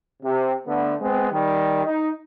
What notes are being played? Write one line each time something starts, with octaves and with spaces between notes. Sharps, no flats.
C3
D3 A3 B3
G#3 B3 C4
D#3 G3
D#4